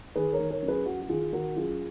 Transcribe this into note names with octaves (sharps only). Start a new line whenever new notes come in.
D#3 G#4 B4
A#4 C#5
D#3
A#4 C#5
F#2
G#4 B4
F#2 F#4
F#4
D#3 F4 G#4
D#3 F#4 A#4
F#2 F4 G#4